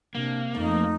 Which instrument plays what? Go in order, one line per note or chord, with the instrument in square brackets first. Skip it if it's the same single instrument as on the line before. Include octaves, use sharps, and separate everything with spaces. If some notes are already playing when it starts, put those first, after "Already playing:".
[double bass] C3 [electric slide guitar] A#3 [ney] D4
[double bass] F2 F3 [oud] A3 [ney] D#4